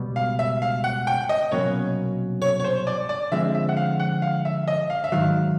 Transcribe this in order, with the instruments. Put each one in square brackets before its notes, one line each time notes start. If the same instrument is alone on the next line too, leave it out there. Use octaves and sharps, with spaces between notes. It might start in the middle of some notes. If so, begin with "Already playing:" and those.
Already playing: [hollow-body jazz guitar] C#2 B2 G3 B3
[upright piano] F5
E5
F5
F#5
G5
D#5
[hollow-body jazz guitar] C2 B2 F#3 A#3 C#4 [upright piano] C#5
[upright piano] C#5
C#5
C5
D5
D5
[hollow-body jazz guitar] D3 F3 G#3 C4 [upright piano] E5
[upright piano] E5
F#5
F5
F#5
F5
E5
D#5
F5
E5
[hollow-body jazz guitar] G#2 D#3 F#3 [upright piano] F5